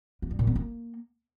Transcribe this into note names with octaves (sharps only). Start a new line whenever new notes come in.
A#3
G2
A#2
B3
A#3